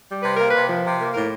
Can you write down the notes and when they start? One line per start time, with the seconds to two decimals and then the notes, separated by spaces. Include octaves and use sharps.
0.09 G3
0.23 C3 B4
0.37 A#3 A#4
0.50 C3 B4
0.69 F3
0.84 C3
0.99 A#3
1.14 A2 A#4